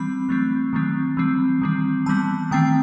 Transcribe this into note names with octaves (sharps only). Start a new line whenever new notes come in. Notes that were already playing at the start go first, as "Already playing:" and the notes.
Already playing: E3 G3 C4 B5
F#3 A3 C4
D#3 F#3 A3 C4
E3 G3 C4
D#3 G3 C4
E3 G3 B3 A5
D#3 A3 C4 G5